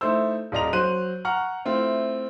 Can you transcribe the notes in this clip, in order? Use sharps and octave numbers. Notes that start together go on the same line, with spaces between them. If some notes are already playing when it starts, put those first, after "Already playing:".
A3 D#4 E4 C5 E6
D#1 F4 D5 D#5 A#5 F7
F#3 C5 F#6 D#7
F#5 A#5 C#6 F6
A3 C4 E4 F4